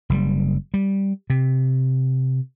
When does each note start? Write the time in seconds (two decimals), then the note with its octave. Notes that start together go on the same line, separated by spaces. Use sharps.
0.10 F#1 C3 G3
0.74 G3
1.30 C3